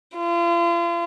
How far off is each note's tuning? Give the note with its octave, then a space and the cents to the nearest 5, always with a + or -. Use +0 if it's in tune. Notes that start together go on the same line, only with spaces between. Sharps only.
F4 -40